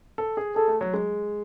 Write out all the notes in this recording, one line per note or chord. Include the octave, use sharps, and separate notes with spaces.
A4
G#4
G#4 A4
A3
F#3
G#3